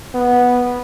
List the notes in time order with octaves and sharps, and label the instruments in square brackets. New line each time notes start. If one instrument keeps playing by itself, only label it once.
[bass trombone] B3